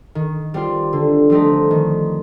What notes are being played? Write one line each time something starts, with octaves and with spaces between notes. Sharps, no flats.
D#3
G3 C4 F4
D3
F3 A3 C4 D#4
D#3